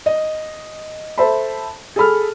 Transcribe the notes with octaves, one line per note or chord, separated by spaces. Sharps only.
D#5
A4 C5 E5 A5 B5
G#4 A4 B5 F6